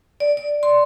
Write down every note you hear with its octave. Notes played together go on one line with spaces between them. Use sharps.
D5
D5
C6